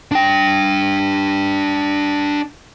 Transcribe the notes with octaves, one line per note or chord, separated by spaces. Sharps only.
D4 G5